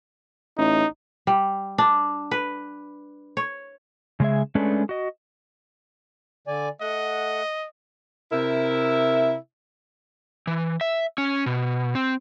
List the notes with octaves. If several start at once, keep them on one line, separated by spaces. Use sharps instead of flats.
A1 D#4
G3
D4
B4
C#5
C#3 G#3 G#4 E5
G#3 A3 C#4 D4 A4 B4
F#4 D#5
D3 D5 G#5
A3 D#5 F#5
C3 E4 A#4 E5
E3
E5
C#4
B2
C4